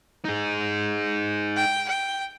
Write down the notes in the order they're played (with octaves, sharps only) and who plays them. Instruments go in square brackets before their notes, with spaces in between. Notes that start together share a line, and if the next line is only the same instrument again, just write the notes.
[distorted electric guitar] D#4 G#4
[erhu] G5
G5